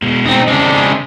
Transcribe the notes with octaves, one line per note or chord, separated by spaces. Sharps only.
B2 G#3
C4 D#4
C#3 G#3 C4 D4